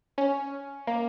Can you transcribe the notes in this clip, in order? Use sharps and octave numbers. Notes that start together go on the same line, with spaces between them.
C#4
A#3